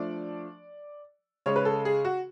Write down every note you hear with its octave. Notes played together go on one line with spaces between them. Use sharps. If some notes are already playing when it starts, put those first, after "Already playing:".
Already playing: F3 A3 D4 D5
C#3 G#3 C#4 C#5
B4
A4
G#4
F#4